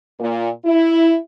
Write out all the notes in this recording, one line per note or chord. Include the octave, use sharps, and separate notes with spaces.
A#2
E4